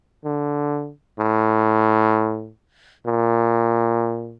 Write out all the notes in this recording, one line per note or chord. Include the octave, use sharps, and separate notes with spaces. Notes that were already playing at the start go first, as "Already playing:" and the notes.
D3
A2
A#2